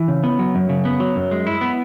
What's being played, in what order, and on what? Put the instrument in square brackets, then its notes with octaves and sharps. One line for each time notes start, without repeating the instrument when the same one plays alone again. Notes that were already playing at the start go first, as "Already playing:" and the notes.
Already playing: [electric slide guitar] E3
C#3
B3
F#3
F#2
C#3
B3
F#3
F#2
G#3
E4
B3